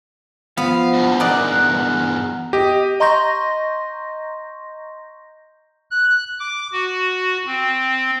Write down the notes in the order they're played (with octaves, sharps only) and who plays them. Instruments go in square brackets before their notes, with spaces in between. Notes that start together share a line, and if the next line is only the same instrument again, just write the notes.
[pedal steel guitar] F3 [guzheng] B3 [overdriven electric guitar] F5
[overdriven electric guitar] E2 G2
[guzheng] D#4 D5 [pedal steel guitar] A#4 F#5
[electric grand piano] G4 [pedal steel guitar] D#5
[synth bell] D#5 A#5 C6 C#6 G6 A#6
[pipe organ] F#6
D6
F#4
C4